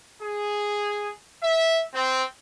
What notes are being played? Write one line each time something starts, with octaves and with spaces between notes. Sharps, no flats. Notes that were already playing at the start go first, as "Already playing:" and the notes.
G#4
E5
C4